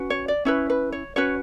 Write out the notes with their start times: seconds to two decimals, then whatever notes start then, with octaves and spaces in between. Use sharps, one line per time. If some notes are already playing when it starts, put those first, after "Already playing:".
Already playing: C#4 F#4 B4
0.10 C#5
0.28 D5
0.45 C#4 E4 B4 C#5
0.70 B4
0.92 C#5
1.16 C#4 F#4 B4 C#5